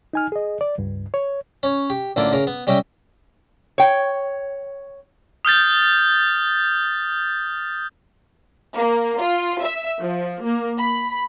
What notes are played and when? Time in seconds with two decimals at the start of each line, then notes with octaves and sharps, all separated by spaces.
0.13 D#4 G#5 F6
0.32 G#4 D#5
0.61 D5
0.78 C#2 G2
1.14 C#5
1.63 C#4 C#5
1.90 G4
2.16 A1 D3 A#3 E4 F4 D6
2.33 C#3 A#4
2.47 B3
2.67 G3 C#4 D#5 E5 G5
3.78 C#5 G5
5.45 D#6 F6 G6 A6
8.73 A#3
9.20 F4
9.59 E5
10.00 F3
10.43 A#3
10.77 B5